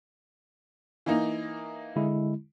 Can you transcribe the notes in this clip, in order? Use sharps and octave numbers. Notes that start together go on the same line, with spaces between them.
E3 A#3 D#4
D3 G#3 E4